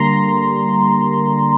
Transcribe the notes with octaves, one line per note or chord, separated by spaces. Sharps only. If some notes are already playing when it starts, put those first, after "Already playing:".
Already playing: D3 G3 A#3 A#5 C6